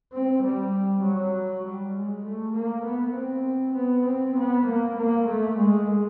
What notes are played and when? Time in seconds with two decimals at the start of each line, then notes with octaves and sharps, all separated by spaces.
0.13 C4
0.43 G3
1.04 F#3
1.64 G3
1.95 G#3
2.25 A3
2.55 A#3
2.85 B3
3.16 C4
3.76 B3
4.06 C4
4.37 B3
4.66 A#3
4.97 A#3
5.27 A3
5.57 G#3